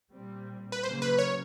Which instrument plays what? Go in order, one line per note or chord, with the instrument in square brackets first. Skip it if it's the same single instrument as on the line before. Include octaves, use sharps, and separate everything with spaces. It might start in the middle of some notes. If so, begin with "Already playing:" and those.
[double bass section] A#2 G3 C4
[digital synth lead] B4
[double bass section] C#3 F#3 A#3 [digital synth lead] C5
[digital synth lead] B4
C#5